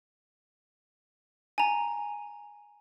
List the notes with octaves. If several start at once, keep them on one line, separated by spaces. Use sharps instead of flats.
G#5 A#5